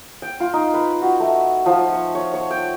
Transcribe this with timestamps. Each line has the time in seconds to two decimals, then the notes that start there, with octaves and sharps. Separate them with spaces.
0.22 G5
0.40 F4
0.53 D#4
0.74 B4
1.02 F#4
1.20 A3
1.66 F3
1.93 C#6
2.15 C#5
2.34 C#5
2.51 G5